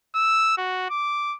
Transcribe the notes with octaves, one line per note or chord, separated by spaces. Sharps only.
E6
F#4
D6